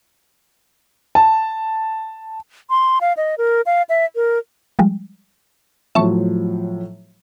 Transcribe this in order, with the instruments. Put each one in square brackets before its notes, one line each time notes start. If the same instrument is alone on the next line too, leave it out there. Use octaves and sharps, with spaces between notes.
[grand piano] A5
[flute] C6
F5
D#5
A#4
F5
E5
A#4
[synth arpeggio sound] F3 G3 G#3
[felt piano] A2 F3 F#3 [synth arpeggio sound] E5 A5 C#6